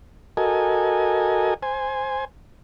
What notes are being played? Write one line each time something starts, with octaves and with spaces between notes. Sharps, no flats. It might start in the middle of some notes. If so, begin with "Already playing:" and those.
F#4 A4 A#4 D#5 G#5
C5 G#5